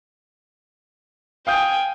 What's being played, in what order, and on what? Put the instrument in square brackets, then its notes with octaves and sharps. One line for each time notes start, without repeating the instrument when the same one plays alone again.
[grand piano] F5 D#6 G6 [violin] G5 G#5